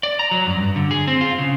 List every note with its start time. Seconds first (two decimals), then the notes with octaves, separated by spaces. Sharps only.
0.03 D5
0.19 A#5
0.31 F#3
0.47 F#2
0.58 G2
0.76 D3
0.91 G#4
1.08 C4
1.21 F4
1.39 C#3